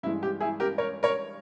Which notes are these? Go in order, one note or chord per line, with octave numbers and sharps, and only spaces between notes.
G2 E3 G#3 E4
G4
E4 G#4
G4 A#4
A#4 C#5
A#4 C#5